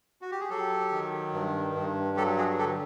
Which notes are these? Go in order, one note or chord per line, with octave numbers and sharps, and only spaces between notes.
F#4
G4
G#4
F#3 G4 A4
D#3
G2
G2
F#3 G4 A4
F#4 G#4
D3 G4 A4